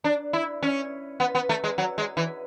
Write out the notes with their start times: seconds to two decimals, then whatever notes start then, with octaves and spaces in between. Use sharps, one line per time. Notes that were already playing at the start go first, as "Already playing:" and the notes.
0.04 D4
0.33 E4
0.63 C#4
1.20 B3
1.35 B3
1.49 A3
1.64 G#3
1.78 F#3
1.98 G#3
2.17 E3